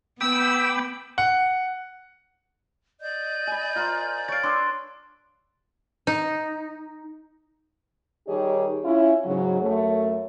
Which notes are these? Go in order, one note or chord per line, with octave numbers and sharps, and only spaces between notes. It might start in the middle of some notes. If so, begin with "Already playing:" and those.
B3 G5 B5 D6 E6
F#5
D5 D#5 G6
G#5 B5
F4 A#4 C5
C#5 F5 A6 D7
D4 B4 C6 E6
D#4
D#3 G3 D#4 G4 G#4 C#5
C#4 E4 F4
G#2 C#3 F#3
F#2 A3 C#5